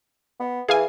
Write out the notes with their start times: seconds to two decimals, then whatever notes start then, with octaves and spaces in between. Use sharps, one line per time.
0.40 B3
0.69 E3 G#4 F5 G#5